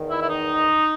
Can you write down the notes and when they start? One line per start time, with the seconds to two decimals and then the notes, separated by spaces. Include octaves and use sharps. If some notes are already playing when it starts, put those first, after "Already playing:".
Already playing: E2 D#3
0.09 E4
0.21 E4
0.29 D#4